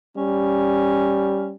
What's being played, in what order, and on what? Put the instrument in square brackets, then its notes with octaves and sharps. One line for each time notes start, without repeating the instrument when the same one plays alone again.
[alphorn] G3 [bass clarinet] C#4